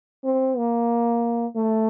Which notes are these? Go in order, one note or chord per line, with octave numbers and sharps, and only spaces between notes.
C4
A#3
A3